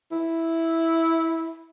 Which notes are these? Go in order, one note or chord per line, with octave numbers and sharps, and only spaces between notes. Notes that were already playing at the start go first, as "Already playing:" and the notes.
E4